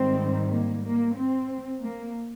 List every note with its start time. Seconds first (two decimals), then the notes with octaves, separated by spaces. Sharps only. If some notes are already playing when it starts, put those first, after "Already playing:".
Already playing: G#2 D#3 G3 C4
0.51 A#3
0.84 A#3
1.16 C4
1.82 A#3